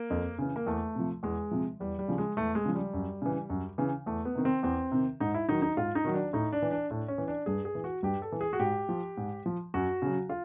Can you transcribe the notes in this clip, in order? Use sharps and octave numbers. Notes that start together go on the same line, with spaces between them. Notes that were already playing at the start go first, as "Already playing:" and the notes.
Already playing: A#3
F2
C#3 E3
A#3
E2 A3
C3 F3
E2 G#3
C3 F3
E2 G3
G3
C#3 F3
G#3
E2 A3
G#3
C#3 F3
G3
F#2
C#3 E3
F#2
C#3 E3
E2 A3
B3
C3 D#3
C4
E2 C4
C3 D#3
G#2 D#4
E4
D#3 F#3 D#4
D#4
G#2 F4
D#4
D#3 F#3
D4
A2 D#4
D4
E3
D4
A2 D4
C#4
E3
D4
G2 G#4
G#4
E3
F#4
G2 G4
A4
E3
G#4
F#4
G#2 G4
F3
G#2
F3
F#2 F#4
C#3 F#3
F4